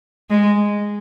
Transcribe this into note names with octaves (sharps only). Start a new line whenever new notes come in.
G#3